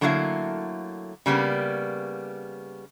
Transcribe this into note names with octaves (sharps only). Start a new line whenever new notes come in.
D3 F#3 A3 A#3 E4 F5
C#3 G3 A#3 B3